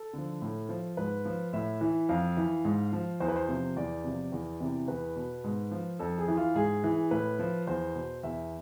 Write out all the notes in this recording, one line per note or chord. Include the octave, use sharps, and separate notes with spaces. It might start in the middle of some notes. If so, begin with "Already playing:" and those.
Already playing: A4
D3 F3
A2
F3
G#2 B4
F3
A2 E5
E3
F2 F5
E3
G#2
F3
E2 C5
B4
C5
C3 F3
E2 D5
C3 F3
E2
C3 E3
E2 B4
B2
G#2
F3
F2 A4
G#4
E3
F4
G#2 G#4
E3
A2 B4
F3
E2 C5
B2
E2 E5